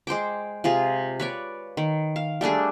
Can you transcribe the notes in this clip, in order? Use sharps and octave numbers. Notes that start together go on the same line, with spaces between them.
G#3 C5 G5 D6
C3 F4 G#4
B4 C#5 D5
D#3
F5
G3 A3 D4 G#4